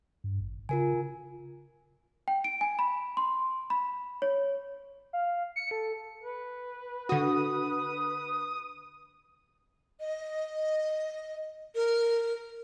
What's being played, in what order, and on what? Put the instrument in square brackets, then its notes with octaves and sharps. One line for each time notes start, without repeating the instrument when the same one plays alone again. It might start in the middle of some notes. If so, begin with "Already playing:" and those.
[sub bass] G2
G#1
[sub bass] C#3 [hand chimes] F4 A#4 G#5
[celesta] G5
D7
G#5
B5
C6
B5
C#5
[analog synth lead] F5
C#7
A4
[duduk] B4
[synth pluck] D3 F#4 [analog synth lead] D#6
[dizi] D#5
A#4